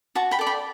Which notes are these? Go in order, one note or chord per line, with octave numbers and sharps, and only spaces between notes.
F#4 A5 C#6
G5 B5
A4 D5
G5 B5